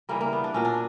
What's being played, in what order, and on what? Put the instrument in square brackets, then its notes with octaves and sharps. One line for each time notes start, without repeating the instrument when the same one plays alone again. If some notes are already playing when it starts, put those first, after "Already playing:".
[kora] C#3 E3 G3 A#3
A#3
B3
D4
A#2 F#3 C#4
D4